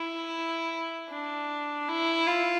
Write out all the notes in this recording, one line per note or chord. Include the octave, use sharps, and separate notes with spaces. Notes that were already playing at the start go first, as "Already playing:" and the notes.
Already playing: E4
D4
E4
F4